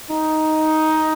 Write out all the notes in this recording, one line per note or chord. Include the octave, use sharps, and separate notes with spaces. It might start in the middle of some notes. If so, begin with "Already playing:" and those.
D#4